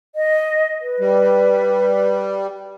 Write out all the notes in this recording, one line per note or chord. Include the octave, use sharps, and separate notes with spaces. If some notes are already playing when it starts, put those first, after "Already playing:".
D#5
B4
G3